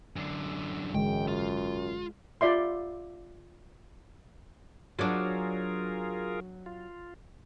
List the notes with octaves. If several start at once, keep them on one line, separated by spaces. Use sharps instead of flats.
F#2 D3
G#1 F#2 D3 E3 G#3 G5
F4
F4 D5 E5 C6
F#3 D4 F4 G#4 A#4
F4